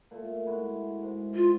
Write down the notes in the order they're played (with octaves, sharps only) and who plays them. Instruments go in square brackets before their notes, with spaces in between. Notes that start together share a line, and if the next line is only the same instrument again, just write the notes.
[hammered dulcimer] A#2 A3
G#3 E4 F#4
G#2
[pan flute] F4